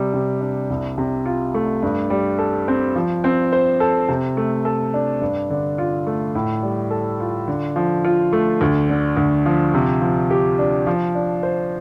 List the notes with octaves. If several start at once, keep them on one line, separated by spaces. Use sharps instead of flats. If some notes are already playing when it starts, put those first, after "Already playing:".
Already playing: C3 G3
C3
D4
C2
C3
F4
A3
G2
G3
A4
C4
F3
C4
C5
A4
C3
A3
A4
D4
G2
D3
F4
A3
A2
G3
A4
F4
D3
F3
F4
A3
D2
D3
D2
F3
C3
F3
G4
D4
F3
D4
C5